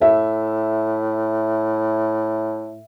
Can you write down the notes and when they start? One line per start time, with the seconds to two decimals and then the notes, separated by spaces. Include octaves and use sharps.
0.02 A2 E5